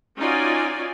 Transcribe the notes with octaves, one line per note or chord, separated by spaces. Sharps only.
C#4 D#4 F4 F#4 D5 G#5